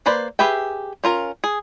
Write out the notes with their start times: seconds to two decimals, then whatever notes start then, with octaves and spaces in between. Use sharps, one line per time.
0.06 A#3 B4 C5 D5
0.39 G4 G#4 B4 E5 G5
1.04 C#4 F4 A#4
1.44 G#4